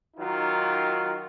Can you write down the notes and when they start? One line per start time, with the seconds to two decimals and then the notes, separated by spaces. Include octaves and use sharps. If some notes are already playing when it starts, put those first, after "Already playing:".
0.17 D#3 F#3 D#4 F4